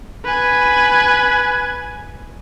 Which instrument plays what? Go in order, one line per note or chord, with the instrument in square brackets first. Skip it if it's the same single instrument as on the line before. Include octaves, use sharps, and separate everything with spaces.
[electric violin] B4 G#5